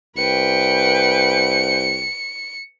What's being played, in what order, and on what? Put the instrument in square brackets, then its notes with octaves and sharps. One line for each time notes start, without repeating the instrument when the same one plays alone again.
[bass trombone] C2 [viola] B4 G5 [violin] C#7